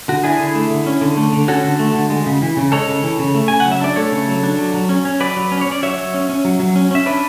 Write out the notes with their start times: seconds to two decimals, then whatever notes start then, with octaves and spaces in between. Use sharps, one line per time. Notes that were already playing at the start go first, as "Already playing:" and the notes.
0.08 D3 F#4
0.24 D4 E4 G#4
0.40 D3
0.55 A3
0.70 D3
0.86 C#4
1.01 D3
1.17 A3
1.33 D3
1.48 C#4 F#4 A4
1.64 D3
1.79 A3
1.95 D3
2.10 G#3
2.26 C#3
2.42 E3
2.57 C#3
2.72 G#3 A4 C#5
2.88 C#3
3.03 E3
3.19 C#3
3.35 A3
3.48 C#3 G#5
3.60 F#3 F#5
3.72 E5
3.81 D4 D5
3.96 A3 A4 C#5
4.12 C#3
4.28 F#3
4.43 D4
4.58 F#3
4.74 F#3
4.89 C#4
5.05 C#4
5.20 F#3 B4 D5
5.36 F#3
5.52 C#4
5.61 C#5
5.66 C#4
5.72 D5
5.82 F#3 C#5 E5
5.98 F#3
6.14 C#4
6.29 C#4
6.45 F#3
6.60 F#3
6.76 C#4
6.91 C#4 E5
7.06 D4 B4 D5